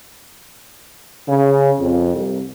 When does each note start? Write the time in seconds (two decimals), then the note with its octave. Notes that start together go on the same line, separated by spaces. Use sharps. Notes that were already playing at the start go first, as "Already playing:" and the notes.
1.28 C#3
1.79 F2
2.14 C2